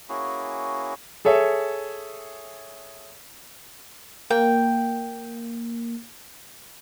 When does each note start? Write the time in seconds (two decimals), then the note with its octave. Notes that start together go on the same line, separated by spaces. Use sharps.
0.09 A#3 C#4 E4 F#4 G#4
1.25 G#4 A4 C#5 E5
4.30 A#3 G5